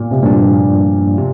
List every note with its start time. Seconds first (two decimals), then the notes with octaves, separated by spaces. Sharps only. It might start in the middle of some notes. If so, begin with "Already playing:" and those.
Already playing: A#2
0.11 C3
0.22 G2 A#2 F3 A#3 D4
1.18 C3